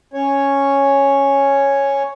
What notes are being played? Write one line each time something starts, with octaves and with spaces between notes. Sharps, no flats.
C#4 C#5